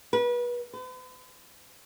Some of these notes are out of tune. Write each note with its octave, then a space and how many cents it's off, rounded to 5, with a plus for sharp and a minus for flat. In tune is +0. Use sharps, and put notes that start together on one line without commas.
B4 -30
B4 +45